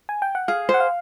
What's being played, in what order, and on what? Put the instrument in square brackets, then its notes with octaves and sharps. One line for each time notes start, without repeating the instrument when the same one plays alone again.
[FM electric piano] G#5
G5
F#5
[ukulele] G#4 [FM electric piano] F5
[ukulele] C5
[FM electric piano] F#5
F5